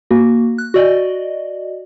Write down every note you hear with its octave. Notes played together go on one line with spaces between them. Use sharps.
A#3 F#4
F#6
F#4 D5 D#5